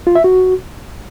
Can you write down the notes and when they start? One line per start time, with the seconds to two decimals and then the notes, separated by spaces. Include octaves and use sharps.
0.07 F4
0.15 E5
0.24 F#4